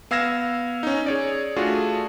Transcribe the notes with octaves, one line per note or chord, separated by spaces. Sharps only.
B3 F5 E6 G#6 A#6 E7
C#4 D#4
G#4 C#5 D5
A3 D4 F4 F#4 G#4